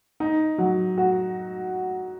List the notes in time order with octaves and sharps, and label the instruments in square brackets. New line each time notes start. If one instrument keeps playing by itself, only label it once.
[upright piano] D#4
F#3
F#4